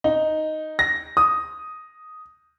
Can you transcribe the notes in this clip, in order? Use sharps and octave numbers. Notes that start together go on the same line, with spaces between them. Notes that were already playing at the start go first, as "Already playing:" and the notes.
D#4
A#6
D#6